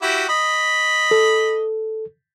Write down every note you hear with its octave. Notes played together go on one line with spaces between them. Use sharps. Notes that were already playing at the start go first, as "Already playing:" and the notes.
E4 F#4 G4
D#5 B5
A4